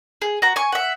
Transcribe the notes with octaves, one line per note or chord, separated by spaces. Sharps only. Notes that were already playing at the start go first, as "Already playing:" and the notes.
G#4
F#4 A#5
G#5 C#6
E5 F#5